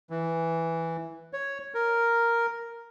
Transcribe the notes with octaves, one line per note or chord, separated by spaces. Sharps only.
E3
C#5
A#4